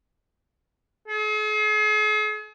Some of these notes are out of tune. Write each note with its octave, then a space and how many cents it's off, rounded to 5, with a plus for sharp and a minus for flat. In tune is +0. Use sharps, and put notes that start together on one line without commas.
G#4 +45